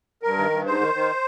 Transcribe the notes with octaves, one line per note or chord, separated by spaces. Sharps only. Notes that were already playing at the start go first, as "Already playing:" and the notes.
G2 A#4
D#3
G2
G#2 C5
D#3
D#3